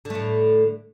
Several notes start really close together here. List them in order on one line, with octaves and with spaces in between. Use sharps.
D3 A3 A2